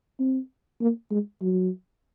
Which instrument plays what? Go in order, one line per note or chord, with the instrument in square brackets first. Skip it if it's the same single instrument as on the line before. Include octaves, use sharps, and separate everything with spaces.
[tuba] C4
A#3
G#3
F#3